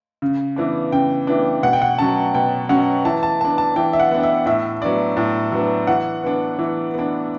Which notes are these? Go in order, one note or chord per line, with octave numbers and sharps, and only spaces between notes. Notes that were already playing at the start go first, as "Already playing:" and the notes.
C#3
E3 B3 D4
C#3 G5
E3 B3 D4
B2 F#5
G5
F#5
F#3 C#4 A5
B2 G5
F#3 C#4 F#5
E3 A5
A5
B3 D4 A5
A5
E3 G5
E5
F#5
B3 D4
E5
A2 E5
F#3 B3 D4 D5
A2
F#3 B3 D4
E3 F#5
B3 D4
E3
B3 D4